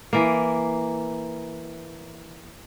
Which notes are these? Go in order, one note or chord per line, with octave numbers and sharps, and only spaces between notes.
E3 A#3